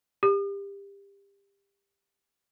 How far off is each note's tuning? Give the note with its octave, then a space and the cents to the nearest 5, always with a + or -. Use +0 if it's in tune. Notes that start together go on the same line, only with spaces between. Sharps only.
G4 +25